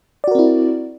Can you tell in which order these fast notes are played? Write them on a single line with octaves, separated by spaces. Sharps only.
D5 F#4 A#4 C4 E4